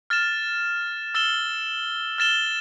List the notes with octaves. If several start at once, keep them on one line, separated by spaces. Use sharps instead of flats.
F6 A6 E7
E6 A6 E7 G7
F6 A6 E7 G7